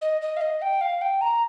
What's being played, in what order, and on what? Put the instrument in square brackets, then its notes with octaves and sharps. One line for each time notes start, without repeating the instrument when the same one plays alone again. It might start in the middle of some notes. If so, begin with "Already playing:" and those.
[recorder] D#5
D#5
F5
D#5
G5
F5
G5
A#5